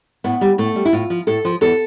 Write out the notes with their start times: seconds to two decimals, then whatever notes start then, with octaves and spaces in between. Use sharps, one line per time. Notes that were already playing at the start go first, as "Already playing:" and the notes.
0.24 A2 B3
0.41 G3
0.58 A2 A3
0.76 G3
0.85 E4
0.93 A2 F4
1.10 F3
1.27 A2 A4
1.45 F3
1.61 E2 A4